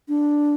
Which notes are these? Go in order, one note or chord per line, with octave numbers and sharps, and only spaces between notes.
D4